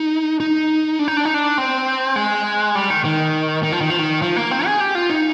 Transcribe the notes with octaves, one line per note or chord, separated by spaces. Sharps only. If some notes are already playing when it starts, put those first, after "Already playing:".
Already playing: D#4
D#4
D4
D#4
D4
D#4
D4
C4
G#3
G3
D#3
D#3
D#3
F3
D#3
F3
D#3
F3
A#3
C4
G#4
G4
F4
D#4